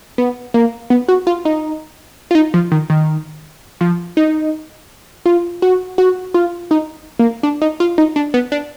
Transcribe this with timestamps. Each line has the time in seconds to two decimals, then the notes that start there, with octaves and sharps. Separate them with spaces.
0.18 B3
0.54 A#3
0.90 B3
1.08 F#4
1.27 F4
1.45 D#4
2.31 F4
2.35 D#4
2.54 F3
2.72 D#3
2.90 D#3
3.81 F3
4.17 D#4
5.26 F4
5.62 F#4
5.98 F#4
6.34 F4
6.71 D#4
7.19 A#3
7.43 D4
7.62 D#4
7.80 F4
7.98 D#4
8.16 D4
8.34 B3
8.52 D4